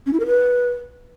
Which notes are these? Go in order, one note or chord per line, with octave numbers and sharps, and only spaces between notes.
C#4
E4
A#4
B4